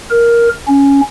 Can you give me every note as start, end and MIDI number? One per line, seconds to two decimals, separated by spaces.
0.10 0.49 70
0.68 1.01 61